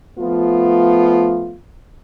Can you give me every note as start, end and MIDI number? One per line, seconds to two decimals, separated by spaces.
0.18 1.58 53
0.18 1.58 57
0.18 1.58 59
0.18 1.58 65